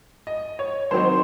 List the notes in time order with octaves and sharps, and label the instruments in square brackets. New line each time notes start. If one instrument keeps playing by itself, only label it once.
[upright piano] D#5
C#5
D#3 F#3 C4 D#4 C5